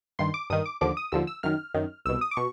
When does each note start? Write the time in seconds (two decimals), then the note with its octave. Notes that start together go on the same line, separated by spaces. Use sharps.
0.19 G2 D#3 C6
0.34 D6
0.50 G2 D#3 D#6
0.66 D6
0.81 D#2 D3 F3 D6
0.97 D#6
1.12 D#2 D3 F3 E6
1.27 E6
1.43 F#2 D#3 F6
1.74 F#2 D#3
2.05 C2 B2 E6
2.21 D#6
2.31 D6
2.37 B2 C#6